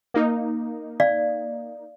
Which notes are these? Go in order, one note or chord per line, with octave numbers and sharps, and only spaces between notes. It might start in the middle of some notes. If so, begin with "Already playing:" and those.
A#3 D#4
D5 F5